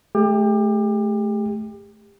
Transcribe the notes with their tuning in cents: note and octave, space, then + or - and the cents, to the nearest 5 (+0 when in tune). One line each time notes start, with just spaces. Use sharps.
A3 -25 G4 +30